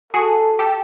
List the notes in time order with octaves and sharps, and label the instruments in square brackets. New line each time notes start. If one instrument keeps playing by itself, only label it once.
[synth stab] F#4 G#4 [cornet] A4
[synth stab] G4 A4